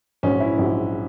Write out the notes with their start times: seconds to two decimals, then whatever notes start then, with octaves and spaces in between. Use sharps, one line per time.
0.23 A#1 G#2 F#3 C#4
0.40 E4
0.58 A#1 G#2 F#3